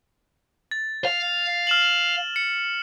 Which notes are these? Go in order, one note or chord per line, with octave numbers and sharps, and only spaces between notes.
A6
F5
F6 E7 F#7
C#7